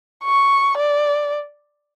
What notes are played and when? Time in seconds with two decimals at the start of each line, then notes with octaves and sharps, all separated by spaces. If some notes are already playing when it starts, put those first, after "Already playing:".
0.24 C#6
0.77 D5